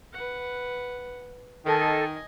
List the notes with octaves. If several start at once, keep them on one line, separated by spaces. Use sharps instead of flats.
B4 F#5
D#3 A4 D#5 G#5